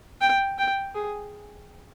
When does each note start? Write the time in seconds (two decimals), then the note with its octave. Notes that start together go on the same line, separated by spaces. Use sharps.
0.21 G5
0.58 G5
0.95 G#4